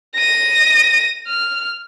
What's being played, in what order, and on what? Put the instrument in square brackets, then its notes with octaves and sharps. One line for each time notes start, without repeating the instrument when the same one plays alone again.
[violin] A#6 D#7
F6